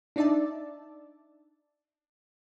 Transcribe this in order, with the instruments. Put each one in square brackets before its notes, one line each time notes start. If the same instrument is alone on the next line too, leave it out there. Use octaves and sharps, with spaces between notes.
[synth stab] D4 D#4 D5 E5 A5